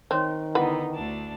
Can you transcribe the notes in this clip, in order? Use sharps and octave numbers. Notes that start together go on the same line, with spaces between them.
D#3 C4 C5 C#5
D3 B3 D#4 E4 B4 F#5
D2 D4 A5